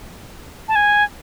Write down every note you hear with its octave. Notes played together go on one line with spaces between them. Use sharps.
A5
G#5